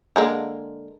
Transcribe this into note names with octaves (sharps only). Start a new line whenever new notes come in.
D3 G#3 A#3